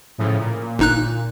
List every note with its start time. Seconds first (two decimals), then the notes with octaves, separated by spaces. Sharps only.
0.18 A2 C#3 F3
0.39 A#2
0.79 G1 D#4 F#6